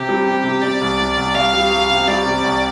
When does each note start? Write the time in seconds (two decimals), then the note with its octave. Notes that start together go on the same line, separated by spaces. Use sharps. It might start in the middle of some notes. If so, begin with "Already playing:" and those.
Already playing: C3 G4
0.09 G3
0.26 C3
0.44 C3
0.62 C3 D5
0.81 C2
0.99 C2
1.17 C2
1.35 C2 F5
1.54 G3
1.71 G3
1.90 C3
2.08 G3 D5
2.26 C3
2.44 C2